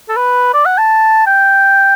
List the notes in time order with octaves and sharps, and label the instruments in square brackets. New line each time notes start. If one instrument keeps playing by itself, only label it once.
[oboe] A4
B4
D5
F#5
A5
G5